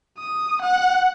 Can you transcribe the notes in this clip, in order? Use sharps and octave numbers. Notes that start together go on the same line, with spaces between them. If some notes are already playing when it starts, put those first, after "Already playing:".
D#6
F#5